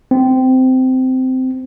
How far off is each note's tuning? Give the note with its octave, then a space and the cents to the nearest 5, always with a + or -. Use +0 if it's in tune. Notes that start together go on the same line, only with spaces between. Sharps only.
C4 -15